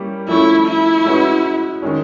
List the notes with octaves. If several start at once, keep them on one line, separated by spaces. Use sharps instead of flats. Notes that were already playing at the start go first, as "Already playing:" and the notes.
Already playing: G3 A#3 C#4 E4 G4
F3 A3 C#4 E4
E4
G#3 C#4 F#4 B4
D#3 G#3 C#4